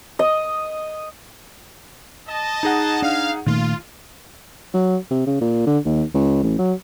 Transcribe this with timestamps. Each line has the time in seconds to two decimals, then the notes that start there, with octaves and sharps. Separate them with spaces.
0.19 D#5
2.27 D#5 A5
2.63 D#4 G#4 F#5
3.02 D4 F5
3.46 A#2 D#3 A3 F4
4.74 F#3
5.11 C3
5.27 C#3
5.41 A#2
5.66 D3
5.85 D#2
6.14 C#2
6.43 A1
6.58 F#3